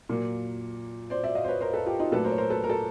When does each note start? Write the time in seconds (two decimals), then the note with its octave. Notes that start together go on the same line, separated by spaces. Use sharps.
0.09 A#2 F#3 A#3
1.10 C5 D5
1.24 D5 E5
1.35 D#5 F5
1.44 C5
1.48 B4 C#5
1.61 A#4 C5
1.74 A4 B4
1.86 F4 G4
2.00 D#4 F4
2.12 A#2 F#3 A3 A4 B4
2.24 A#4 C5
2.31 C#5
2.38 A#4 C5
2.50 A4 B4
2.64 A#4
2.70 A4